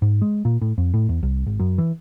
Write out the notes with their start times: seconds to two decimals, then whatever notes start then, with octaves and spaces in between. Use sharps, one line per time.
0.02 G#2
0.22 G#3
0.45 A#2
0.61 A2
0.78 F2
0.94 A2
1.09 E2
1.23 C2
1.46 G#1
1.60 F#2
1.78 E3